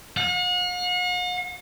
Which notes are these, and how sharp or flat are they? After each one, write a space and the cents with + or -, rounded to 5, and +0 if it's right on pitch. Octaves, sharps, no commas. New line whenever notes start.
F#5 -45